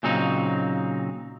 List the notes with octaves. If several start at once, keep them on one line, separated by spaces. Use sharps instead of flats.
A#2 C#3 F#3 C4 D#4